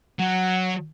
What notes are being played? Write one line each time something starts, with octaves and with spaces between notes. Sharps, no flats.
F#3 F#5